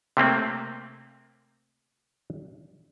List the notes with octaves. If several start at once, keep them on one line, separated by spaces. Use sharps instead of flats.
C3 A3 A#3 C4